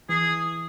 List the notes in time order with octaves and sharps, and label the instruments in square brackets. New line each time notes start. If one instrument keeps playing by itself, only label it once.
[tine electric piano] E3 [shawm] G#4